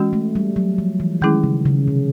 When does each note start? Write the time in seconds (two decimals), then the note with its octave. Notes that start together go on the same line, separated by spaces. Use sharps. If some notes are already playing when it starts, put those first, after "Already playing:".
Already playing: E3 G#3 C#4 F#4
0.13 A3
0.35 G3
0.56 F#3
0.78 F3
1.00 E3
1.22 D#3 G#3 C#4 E4 G#4
1.44 C#3
1.65 C#3
1.88 C3